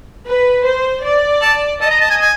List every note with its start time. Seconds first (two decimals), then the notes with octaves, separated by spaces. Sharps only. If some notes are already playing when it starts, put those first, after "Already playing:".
0.25 B4
0.65 C5
1.03 D5
1.42 A5
1.81 D#5 A5
1.91 A#5
2.00 A5
2.10 G#5
2.21 G#5